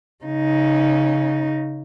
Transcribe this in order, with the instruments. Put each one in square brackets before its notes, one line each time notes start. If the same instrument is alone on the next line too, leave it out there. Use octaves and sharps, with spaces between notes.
[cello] C#3 D#4